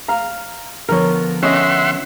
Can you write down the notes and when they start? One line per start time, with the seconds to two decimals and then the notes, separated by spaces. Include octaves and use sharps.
0.08 F5 A#5
0.89 D3 F3 B3 A#4 C#5
1.43 C#4 D#5 E5 F#5 C6